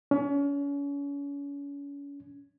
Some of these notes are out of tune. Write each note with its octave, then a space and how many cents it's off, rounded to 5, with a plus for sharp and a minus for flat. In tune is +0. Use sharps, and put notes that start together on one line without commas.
C#4 +35